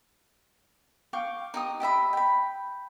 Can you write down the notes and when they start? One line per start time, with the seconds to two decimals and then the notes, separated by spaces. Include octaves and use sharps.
1.13 F5 G5 C#6 D6
1.54 D#4 G4 D#6
1.80 G4 D#5 E5 B5
2.13 G5 B5